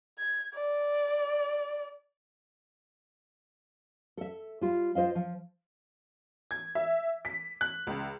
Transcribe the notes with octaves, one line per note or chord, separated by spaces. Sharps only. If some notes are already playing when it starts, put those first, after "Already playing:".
G#6
D5
A4 E5
G3 F4
F4 C5 D#5 F5
F3
G#6
E5
B6
F#6
C#2